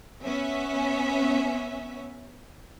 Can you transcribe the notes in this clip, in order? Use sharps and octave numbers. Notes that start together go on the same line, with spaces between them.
B3 C#4 E5